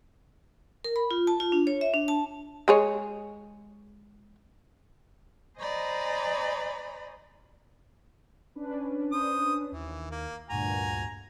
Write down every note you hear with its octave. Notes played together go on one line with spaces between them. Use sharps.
A#4
B5
F4
A5
F4
D4
C#5
E5
D4
A5
G#3 G#4 C#5
C5 D5 D#5 G#5 A#5 B5
C#4 D4 B4
C5 D#6
D#2 E3
A#3
D2 G2 A#2 F#4 G#5 A#5